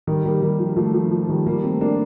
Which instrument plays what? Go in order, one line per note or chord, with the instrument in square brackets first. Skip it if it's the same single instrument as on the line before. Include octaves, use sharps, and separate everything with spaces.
[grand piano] D#3 G3
G3 A#3
D#3 G3
F3
F3 A3
F3
F3
D#3 G3
G3 A#3
A3 C4
A#3 D4